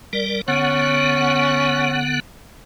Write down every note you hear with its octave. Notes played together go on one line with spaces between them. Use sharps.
G3 A#4 D5
D3 B3 C#4 F#5